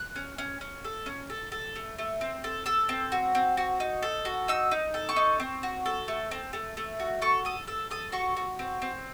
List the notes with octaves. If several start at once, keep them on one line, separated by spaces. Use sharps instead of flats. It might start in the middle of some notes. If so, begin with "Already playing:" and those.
Already playing: F#6
C#4
C#4
C#4
A4
C#4
A4
A4
A3
A3
C4
A4
A4 E6
C4
F#4
C4
F#4
D#4
A4
F#4
D#4 E6
D#4
A4
C#6
D#4
C4
F#4
A4
A3
C4
A3
A3
F#4
A4 C#6
A4 D#6
A4 E6
A4 D#6
F#4 C#6
F#4
C4
C4